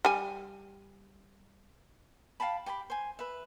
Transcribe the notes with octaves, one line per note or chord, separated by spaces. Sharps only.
G3 G#5
F5 G5 A5 B5
G4 G5 G#5 B5
C5 G#5
B4 E5